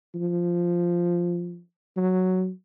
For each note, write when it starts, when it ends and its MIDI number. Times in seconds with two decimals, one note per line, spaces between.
0.15 1.60 53
1.97 2.50 54